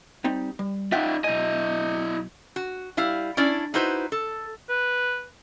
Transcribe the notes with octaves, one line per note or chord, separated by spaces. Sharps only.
G3 C4 D#4
G3
D#4 F4 E5 F#5 G5
B1 E4 D#5 G#5
F#4
G3 E4 F5
C#4 D4 E4 D5
D#4 E4 F#4 B4 C5
A4
B4